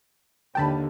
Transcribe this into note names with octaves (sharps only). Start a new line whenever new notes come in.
D#2 D3 G5 A5 B5